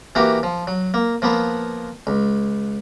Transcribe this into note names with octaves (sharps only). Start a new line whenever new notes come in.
E3 A#3 F#4 G4
F3
F#3
A#3
F3 A#3 B3 B4
C#2